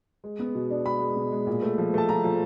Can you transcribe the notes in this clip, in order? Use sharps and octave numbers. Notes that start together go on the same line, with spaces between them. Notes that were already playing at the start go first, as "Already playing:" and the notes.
G#3
B3
B2
D4
G#3 B5
G#3
B2
G#3
A#2
A3
F3
A3 A5
F3 A#5
F3